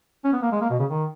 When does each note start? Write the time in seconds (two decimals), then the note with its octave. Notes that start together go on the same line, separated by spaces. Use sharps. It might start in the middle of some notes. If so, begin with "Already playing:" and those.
0.24 C#4
0.33 B3
0.42 A#3
0.52 G#3
0.61 A#3
0.70 B2
0.79 C#3
0.89 D#3